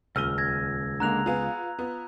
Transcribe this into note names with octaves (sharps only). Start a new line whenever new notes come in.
D#1 C#2 E6 F6 D#7 G7
G#6 A#6
D3 G#3 A#3 A#5 F#6 F7
B3 F4 G#4
B3 F4